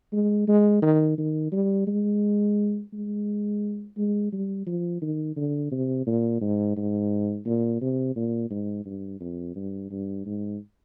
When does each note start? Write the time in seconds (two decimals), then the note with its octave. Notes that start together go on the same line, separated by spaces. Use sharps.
0.13 G#3
0.48 G#3
0.82 D#3
1.18 D#3
1.52 G3
1.87 G#3
2.93 G#3
3.97 G#3
4.32 G3
4.66 F3
5.02 D#3
5.36 D3
5.71 C3
6.07 A#2
6.41 G#2
6.77 G#2
7.46 A#2
7.81 C3
8.16 A#2
8.50 G#2
8.86 G2
9.20 F2
9.56 G2
9.91 G2
10.26 G#2